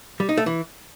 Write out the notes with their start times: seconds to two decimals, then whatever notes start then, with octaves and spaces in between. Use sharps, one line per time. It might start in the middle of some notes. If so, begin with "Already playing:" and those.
0.20 G3
0.29 D#4
0.38 A3
0.46 E3